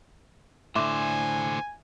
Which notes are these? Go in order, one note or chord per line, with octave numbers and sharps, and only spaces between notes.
A2 D3 D4 C5 E5 G#5 C6 D6